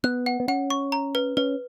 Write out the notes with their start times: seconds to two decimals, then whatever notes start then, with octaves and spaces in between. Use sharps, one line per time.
0.04 B3 F#6
0.26 F#5
0.40 B3
0.48 C#4 F#5
0.70 C#6
0.92 A#5
1.15 B4
1.37 C#4 B4